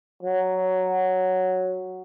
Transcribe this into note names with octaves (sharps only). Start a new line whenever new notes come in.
F#3